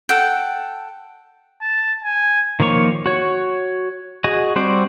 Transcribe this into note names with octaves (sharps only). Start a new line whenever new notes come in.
A4 F#5 G5
A5
G#5
D#3 F3 A#3 C#5 C#6
F#4 C#5
F#4 G#4 D#5
G3 C4 F#4 C5 D5